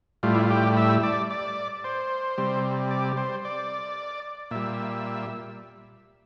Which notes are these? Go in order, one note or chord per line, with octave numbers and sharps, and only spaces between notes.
A2 G3 F4
E4
F4
G4
E5
D5
D5
C5
C3 G3
D5
C5
D5
A#2 G3 E5